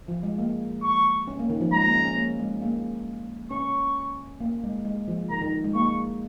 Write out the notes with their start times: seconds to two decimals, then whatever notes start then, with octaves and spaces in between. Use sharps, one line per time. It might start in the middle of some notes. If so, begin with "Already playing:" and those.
0.08 F3
0.23 G#3
0.38 A#3
0.83 C#6
1.28 C#4
1.39 A#3
1.50 D#3
1.61 F3
1.72 G#3 A#5
1.83 A#3
1.95 C#4
2.06 C#4
2.17 A#3
2.39 G#3
2.62 A#3
3.51 C#4 C#6
4.40 A#3
4.64 G#3
4.85 G#3
5.08 F3
5.30 D#3 A#5
5.42 D#3
5.64 G#3
5.75 A#3 C#6